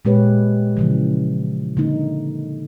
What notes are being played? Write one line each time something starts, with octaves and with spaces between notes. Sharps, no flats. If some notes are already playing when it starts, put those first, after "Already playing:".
A#2 G#3 G4 B4 C#5
C#3 E3 F3
D3 A#3 D#4